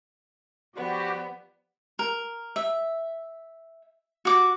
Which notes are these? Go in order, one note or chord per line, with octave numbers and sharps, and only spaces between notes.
F3 G3 B3 F#4 G4
A#4
E5
F#4 D6